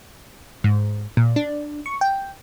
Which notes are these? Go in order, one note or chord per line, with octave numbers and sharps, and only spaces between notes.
G#2
A#2
D4
C#6
G5